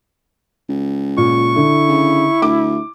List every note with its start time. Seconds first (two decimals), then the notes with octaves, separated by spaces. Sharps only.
0.69 C#2
1.17 A#2 C#6
1.56 D3 E4
1.89 C#3
2.42 D2 D6